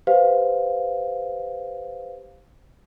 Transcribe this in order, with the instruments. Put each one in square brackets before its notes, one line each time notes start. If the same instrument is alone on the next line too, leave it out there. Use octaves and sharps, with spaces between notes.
[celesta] G4 B4 C5 F5